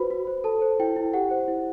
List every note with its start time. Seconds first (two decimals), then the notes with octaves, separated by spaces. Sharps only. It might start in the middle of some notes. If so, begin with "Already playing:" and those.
Already playing: F#4 B4 C5 B5
0.10 F#4
0.27 C5
0.44 A4 A5
0.62 C5
0.80 E4 G5
0.96 E4
1.14 G4 F#5
1.31 C5
1.48 E4